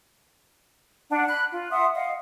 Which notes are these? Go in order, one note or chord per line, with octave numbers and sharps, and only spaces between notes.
D4 F#5
B5 F#6
F4
E5 F#5 C6 D#6
D#5 F5 F#5